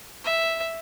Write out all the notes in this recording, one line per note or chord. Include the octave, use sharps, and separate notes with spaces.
E5